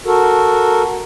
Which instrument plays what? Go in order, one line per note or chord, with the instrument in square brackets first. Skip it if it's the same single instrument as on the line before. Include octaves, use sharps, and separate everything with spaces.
[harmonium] F#4 A4 A#4